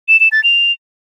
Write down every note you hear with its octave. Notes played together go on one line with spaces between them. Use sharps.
E7
E7
A6
F7